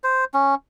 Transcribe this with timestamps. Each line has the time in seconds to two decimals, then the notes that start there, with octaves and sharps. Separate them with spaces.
0.04 C5
0.34 C#4